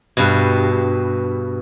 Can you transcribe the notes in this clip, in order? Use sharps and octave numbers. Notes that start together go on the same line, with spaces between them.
G2 B2